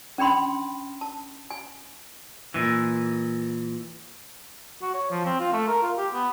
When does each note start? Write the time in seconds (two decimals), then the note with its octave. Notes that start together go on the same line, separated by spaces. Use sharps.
0.18 C#4 D4 G5 B5 C6
1.01 A5
1.50 G#5
2.54 A#2 E3
4.82 F#4
4.94 C#5
5.11 F3
5.26 C4
5.40 F4
5.53 A3
5.68 A#4
5.83 F4
5.97 G4
6.14 B3